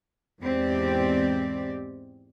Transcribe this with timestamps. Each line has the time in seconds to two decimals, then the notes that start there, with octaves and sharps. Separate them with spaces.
0.40 E2 G#2 C4 G4 D5